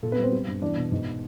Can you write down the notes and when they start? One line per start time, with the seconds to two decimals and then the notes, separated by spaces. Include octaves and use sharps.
0.03 A#2 A4
0.12 B3 B4
0.18 G3 C4 C5
0.32 G3
0.47 G2
0.62 E2 D4 D5
0.76 B2
0.92 G#2